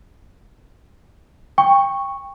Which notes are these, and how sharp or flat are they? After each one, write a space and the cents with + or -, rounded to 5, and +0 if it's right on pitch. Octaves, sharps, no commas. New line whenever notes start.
G5 +20 C#6 -5